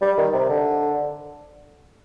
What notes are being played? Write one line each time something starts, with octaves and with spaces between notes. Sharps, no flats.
G3
D#3
C3
D3